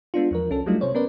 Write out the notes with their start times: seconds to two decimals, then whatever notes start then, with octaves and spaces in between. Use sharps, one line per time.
0.14 G#3 B3 D4 F4
0.31 E2 F3 A#4
0.50 C2 C#4 A4
0.66 F#3 G3 A3 D4 D#4 F4
0.81 C3 C5 C#5
0.94 B3 C#4 A#4 B4 D5